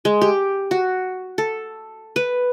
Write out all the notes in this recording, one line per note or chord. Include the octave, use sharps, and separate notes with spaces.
G#3
G4
F#4
A4
B4